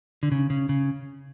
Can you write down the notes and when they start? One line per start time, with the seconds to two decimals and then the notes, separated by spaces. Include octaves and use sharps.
0.23 D3
0.32 C#3
0.50 C#3
0.69 C#3